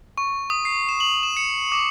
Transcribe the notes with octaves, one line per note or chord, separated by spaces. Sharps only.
C#6
D#6
C7
E7
F#7
E7
C#7
D6